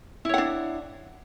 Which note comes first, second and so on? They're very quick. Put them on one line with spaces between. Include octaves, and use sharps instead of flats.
E4 C#5 F#5 D4